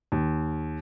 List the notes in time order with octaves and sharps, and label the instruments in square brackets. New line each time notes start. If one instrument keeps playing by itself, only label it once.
[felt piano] D#2